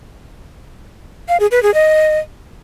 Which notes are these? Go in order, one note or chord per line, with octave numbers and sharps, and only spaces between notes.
F5
G#4
B4
G#4
D#5